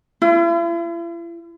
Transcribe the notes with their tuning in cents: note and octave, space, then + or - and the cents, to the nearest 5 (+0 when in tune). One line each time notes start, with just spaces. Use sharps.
E4 +45